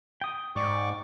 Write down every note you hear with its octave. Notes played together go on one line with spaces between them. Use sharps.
G5 D#6
G#2 D5 C#6 D6